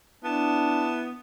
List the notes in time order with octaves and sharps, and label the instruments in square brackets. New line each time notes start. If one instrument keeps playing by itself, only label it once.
[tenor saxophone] B3 [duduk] D4 [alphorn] E4 [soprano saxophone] A5